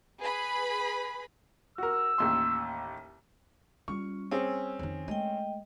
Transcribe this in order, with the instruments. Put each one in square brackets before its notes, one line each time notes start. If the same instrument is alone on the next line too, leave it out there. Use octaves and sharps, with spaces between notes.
[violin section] G#4 B4 B5
[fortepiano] F#4 A#4 [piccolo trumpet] E6
[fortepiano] A1 D#2 C6
[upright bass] G3 [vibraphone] C#4 F4 [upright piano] C#6
[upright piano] C4 C#4 G#4 [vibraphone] E6
[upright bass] F2 D#3
[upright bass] G#3 A3 [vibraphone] D#5 G5